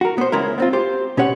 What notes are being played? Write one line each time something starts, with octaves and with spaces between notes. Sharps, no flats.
F#4 A#4
B3 C5
C#2 C#3 G#3 E4 A#4
B3 C4 F4
G4 C5
B2 C#4 G4 C#5 F#5